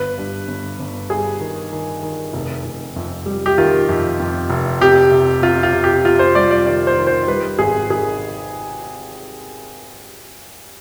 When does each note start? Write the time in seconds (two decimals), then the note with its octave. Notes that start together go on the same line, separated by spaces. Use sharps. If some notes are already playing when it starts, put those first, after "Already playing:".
Already playing: G1 B4
0.18 G2
0.48 G1
0.79 G1
1.10 G2 G#4
1.41 D#3
1.73 D#3
2.03 D#3
2.33 F1
2.65 F1
2.96 F2
3.26 G3
3.46 G4
3.58 D#3 F4
3.89 F2
4.20 F2
4.50 F1
4.81 C3 G4
5.11 C3
5.42 C3 F4
5.63 F4
5.74 C3
5.84 G4
6.05 C3 F4
6.19 C5
6.35 G3 D5
6.51 D5
6.66 D#3 D5
6.87 C5
6.98 D#3
7.07 C5
7.27 G3 B4
7.59 G#1 G#4
7.90 D#3 G#4